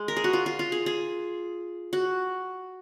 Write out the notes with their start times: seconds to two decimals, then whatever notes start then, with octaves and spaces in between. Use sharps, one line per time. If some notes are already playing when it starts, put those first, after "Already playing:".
Already playing: G#3
0.08 A#4
0.17 G#4
0.24 F#4
0.33 F4
0.46 F4
0.59 F4
0.72 G#4
0.86 G#4
1.93 F#4